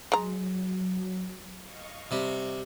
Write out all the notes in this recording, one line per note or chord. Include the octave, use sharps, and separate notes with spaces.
F#3 G#3 A#5
D#5 F5 C#6
C3 G3